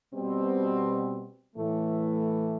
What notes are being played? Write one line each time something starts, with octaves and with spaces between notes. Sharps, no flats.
B2 G3 C4
A2 E3 A3